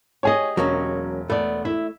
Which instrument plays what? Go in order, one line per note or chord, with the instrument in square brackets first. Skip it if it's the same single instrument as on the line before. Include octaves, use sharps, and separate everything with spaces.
[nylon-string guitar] G4 G#4 D#5 [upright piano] C#5 G#5
[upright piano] E1 [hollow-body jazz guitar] F#3 A#3 C#4
[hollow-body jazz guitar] A3 [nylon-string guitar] B3 D5
[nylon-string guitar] E4 E5